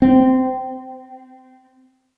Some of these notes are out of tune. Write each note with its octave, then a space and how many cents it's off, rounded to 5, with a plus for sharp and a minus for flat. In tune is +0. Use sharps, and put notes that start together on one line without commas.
C4 -20